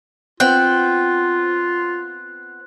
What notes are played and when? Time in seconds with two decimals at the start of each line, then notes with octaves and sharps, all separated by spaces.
0.40 B3 C4 F4 F#5 G5 F#6